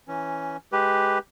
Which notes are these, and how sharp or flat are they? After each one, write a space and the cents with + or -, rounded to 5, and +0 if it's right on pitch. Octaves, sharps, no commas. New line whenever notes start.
E3 +0 C#4 +0
G#3 +5 G4 +0 B4 +0